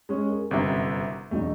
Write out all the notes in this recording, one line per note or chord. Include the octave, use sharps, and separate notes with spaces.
G#3 C#4
G#4 A#4
G1 F#2 C3 D#3 E5 A#5
E1 B1 A3 D#4